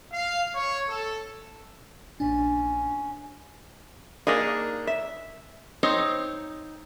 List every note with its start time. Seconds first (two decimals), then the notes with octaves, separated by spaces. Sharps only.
0.12 F5
0.55 C#5
0.88 A4
2.20 A#1 A#2 C#4 D4
4.27 A#3 D4 D#4 G#4
4.87 E5
5.83 C4 D#4 C5 C#5